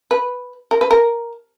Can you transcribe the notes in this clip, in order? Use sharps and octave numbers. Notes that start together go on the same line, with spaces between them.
B4
A#4
B4
A#4